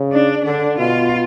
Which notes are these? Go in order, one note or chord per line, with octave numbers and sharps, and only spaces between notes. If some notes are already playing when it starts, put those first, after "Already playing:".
Already playing: C#3
D4
D3 D4
B2 F4